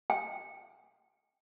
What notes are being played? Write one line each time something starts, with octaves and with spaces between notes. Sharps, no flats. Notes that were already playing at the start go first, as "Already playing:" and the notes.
G5